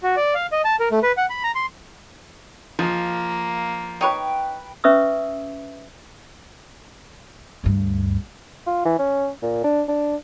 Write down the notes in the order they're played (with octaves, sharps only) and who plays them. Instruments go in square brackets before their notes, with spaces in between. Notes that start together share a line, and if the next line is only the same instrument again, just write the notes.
[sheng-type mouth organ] F#4
D5
F5
D#5
A5
A#4
A3
B4
F#5
B5
A#5
C6
[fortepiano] F3 [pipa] G#3 [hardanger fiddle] A#3
[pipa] D#4 C#5 [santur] B4 G5
[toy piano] C#4 B4 E5 C#6 D#6 E6
[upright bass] D2 G2
[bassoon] F4
E3
C#4
A#2
D4
D4